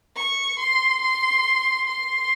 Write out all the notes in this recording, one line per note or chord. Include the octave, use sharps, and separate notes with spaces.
C#6
C6
C6
C6